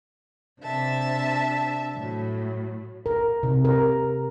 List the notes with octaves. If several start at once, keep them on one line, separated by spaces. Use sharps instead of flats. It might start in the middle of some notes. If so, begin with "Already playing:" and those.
C3 D4 E5 A5
A2 F#3
A#4
C3
A#4